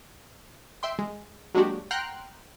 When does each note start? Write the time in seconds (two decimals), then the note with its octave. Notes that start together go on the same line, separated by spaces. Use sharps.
0.83 E5 G5 C6
0.99 G#3
1.54 F#3 G#3 A#3 D4 F#4 G4
1.91 F#5 G5 A#5 C6 F6 F#6